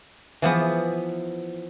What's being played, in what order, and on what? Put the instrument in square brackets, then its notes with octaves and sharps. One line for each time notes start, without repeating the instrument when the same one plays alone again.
[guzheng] E3 F3 B3